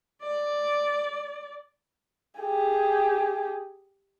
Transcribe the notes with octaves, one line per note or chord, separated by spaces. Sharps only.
D5
G4 G#4